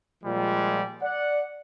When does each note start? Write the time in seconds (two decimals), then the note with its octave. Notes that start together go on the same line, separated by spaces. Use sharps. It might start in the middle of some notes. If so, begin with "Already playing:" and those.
0.24 A#2 F3 G3 G#3
1.01 D5 F#5